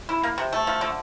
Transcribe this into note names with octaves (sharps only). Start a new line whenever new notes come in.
E4
A#3
C3
A3
F3
D3